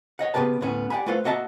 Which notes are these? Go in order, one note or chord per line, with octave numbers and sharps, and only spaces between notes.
C#5 D#5 F#5
C#3 E3 B3 G4 B4 A5
D2 A2 B3 C#4
G4 D5 F#5 G#5 B5
A3 F4 A4 B4 C5 F5
A#3 F#4 D#5 E5 A5